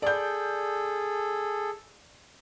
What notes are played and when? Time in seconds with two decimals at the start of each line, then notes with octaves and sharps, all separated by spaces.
0.02 G#4 A4 D5 G6